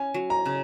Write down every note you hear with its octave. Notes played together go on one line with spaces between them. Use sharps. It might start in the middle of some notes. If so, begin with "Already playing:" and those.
Already playing: C#4 G#5
F#3
A#5
C#3